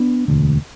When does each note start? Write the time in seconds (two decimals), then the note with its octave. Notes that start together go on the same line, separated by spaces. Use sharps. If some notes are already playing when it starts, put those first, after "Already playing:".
Already playing: B3 D4
0.28 E1 D2 D3